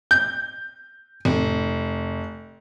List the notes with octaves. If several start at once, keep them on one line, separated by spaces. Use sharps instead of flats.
G6
F1